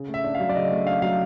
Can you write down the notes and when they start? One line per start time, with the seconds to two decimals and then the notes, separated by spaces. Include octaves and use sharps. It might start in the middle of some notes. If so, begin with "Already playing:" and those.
Already playing: C#3
0.08 A3
0.14 E5
0.24 D4
0.35 F5
0.40 F#3
0.49 D5
0.56 C#3 D#5
0.71 A3
0.86 D4 F5
1.02 F#3 F5